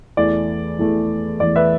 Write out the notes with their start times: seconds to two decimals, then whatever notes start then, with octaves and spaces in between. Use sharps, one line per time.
0.17 E2 E3 A3 D5
0.79 E2 E3 A3
1.40 E2 E3 A3 D5
1.56 B4 E5